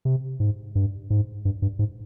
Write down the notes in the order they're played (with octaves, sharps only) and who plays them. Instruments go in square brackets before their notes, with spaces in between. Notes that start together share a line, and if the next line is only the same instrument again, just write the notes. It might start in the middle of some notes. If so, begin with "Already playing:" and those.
[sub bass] C3
G#2
G2
G#2
G2
G2
G#2